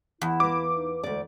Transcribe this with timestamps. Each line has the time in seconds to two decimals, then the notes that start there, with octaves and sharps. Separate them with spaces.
0.21 E2 E4
0.40 A#3 B4 D6
0.75 D#4
1.03 D2 G#3 D5